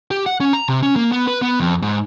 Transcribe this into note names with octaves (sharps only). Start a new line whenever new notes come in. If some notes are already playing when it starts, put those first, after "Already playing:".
G4
F#5
C#4
A#5
C3
C#4
A#3
B3
B4
B3
F2
G#2